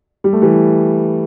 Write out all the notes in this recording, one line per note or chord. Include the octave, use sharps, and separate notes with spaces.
G3
A3
E3 G3